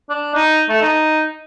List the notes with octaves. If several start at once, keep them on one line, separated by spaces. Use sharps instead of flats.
D4
D#4
A3
D#4